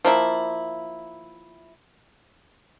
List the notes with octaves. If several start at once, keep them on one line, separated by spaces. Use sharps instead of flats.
F3 A#3 E4